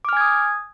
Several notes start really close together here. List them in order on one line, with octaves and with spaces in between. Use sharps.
D6 F6 G#5 G#6 D#6